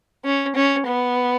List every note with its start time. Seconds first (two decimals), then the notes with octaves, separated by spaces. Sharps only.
0.25 C#4
0.55 C#4
0.86 B3